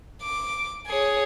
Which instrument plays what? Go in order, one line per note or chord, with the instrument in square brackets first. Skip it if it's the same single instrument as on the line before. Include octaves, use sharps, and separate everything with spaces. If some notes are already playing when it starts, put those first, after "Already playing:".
[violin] D6
G#4 C#5